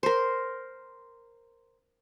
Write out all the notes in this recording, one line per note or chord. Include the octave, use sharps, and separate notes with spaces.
A#4 C5